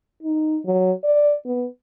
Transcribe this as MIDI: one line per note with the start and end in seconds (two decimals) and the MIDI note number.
0.23 0.59 63
0.65 0.92 54
1.04 1.35 74
1.46 1.67 59